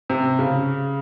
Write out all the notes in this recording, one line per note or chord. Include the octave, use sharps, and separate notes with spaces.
C3
C#3